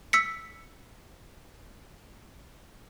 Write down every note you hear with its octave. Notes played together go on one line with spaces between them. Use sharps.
E6 B6 C#7